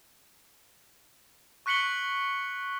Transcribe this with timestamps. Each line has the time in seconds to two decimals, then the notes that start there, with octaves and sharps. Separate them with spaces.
1.66 C#6 F#6 B6 C#7 F#7 G7